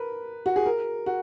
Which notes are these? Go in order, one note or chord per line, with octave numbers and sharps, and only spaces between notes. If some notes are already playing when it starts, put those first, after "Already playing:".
Already playing: A#4 B4
F#4
G#4
A#4
F#4